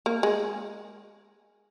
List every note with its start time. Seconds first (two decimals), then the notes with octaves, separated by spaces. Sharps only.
0.06 A#3
0.23 G#3